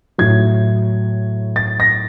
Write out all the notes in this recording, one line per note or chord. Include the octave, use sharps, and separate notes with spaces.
A2 F#3 G#6
A6
A#6